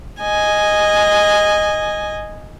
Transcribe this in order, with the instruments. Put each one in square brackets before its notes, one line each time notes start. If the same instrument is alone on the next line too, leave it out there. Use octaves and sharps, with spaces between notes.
[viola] D#5 G#5